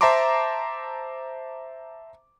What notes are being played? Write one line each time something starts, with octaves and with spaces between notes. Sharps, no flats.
C5 E5 A5 A#5 C6 D6